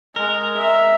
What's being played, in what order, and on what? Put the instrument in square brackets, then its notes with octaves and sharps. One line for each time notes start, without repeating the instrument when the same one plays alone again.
[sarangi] G#3 [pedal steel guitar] A#4
[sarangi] E5